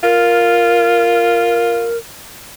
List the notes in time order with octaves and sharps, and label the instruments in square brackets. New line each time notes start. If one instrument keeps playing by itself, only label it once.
[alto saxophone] F4 [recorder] A#4